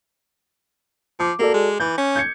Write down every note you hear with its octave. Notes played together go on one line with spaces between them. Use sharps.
F3 D6
A#3 F#4 A4 D5
G#3
E3 G6
C#4
G6 G#6 C#7